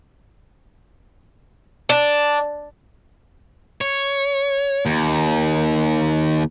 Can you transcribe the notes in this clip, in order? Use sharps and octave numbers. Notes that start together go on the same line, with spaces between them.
D4
C#5
D#2